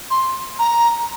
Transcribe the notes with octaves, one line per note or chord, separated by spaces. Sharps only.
C6
A#5